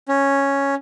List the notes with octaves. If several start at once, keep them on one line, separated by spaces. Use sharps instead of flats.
C#4